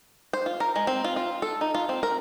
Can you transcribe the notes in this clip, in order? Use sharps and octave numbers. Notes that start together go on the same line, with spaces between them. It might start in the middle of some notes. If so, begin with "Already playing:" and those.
C5
F4
A#4
G#3
C4
F4
F4
A4
D#4
F4
C4
A#4